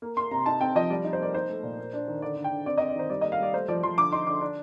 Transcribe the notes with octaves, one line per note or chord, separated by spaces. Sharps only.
A#3
A#3 C6
C3 A#5
D#4 A5
C4 G5
F3 D#5
G3 D5
D#4
C5
A#3 D5
D#4 C5
A3
A#2
A#3
D4
D#3
D3 D5
D3
G5
D3
C4 D5
C4 D#5
D5
D#3 C5
G3 D5
A#3 D#5
F5
G3 D5
A3 C5
F3 D5
F3 C6
D3 D6
D#4 C6
D3 D6
D4